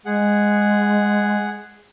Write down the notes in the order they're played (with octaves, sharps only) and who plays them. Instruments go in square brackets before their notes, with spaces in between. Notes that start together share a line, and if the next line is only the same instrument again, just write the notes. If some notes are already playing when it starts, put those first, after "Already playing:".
[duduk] G#3 [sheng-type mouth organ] G#4 F#5